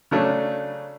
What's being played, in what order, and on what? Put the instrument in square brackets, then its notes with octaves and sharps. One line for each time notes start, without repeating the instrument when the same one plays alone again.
[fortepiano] C#3 F#3 A3 C#4 D4